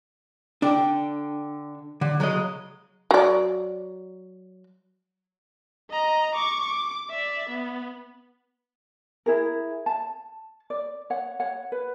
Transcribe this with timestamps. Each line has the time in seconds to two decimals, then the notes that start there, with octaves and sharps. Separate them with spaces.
0.62 D3 D4 G5
2.01 D3
2.20 C#3 F#3 G#3 D#5
3.11 F#3 D5
5.90 D#5 A#5
6.35 C#6 D6
6.66 D6
7.11 D5 E5
7.49 B3
9.26 E4 G#4 A#4
9.86 A5
10.70 D5
11.10 C#5 F#5
11.40 C#5 F#5
11.72 B4